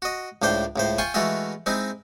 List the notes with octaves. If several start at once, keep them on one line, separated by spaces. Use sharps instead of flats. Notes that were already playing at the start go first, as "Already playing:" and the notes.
F#4 D#5
C#2 A2 D4 C5 G5
C#2 A2 C5
F4 G5 G#5 C#6
E3 G#3 A3 F4 F#4 E5
G#3 C4 D#4 E4